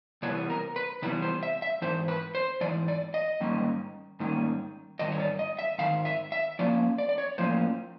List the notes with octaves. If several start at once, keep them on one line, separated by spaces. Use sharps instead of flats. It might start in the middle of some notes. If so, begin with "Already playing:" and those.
C3 E3 G3 B3 C#5
A#4
B4
C3 E3 G3 B3 B4
C5
E5
E5
G#2 E3 C5
B4
C5
G#2 E3 D5
D5
D#5
G#2 D#3 G3 A#3 C#4
G#2 D#3 G3 A#3 C#4
G#2 D#3 G3 D#5
C#5
D5
D#5
E5
G#2 D#3 F5
E5
E5
A2 F3 A#3 C#4 D5
D5
D5
C#5
A2 F3 A#3 C#4 C5